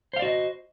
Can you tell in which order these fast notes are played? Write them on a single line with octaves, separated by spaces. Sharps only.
C5 F5 D5 F#4 D#5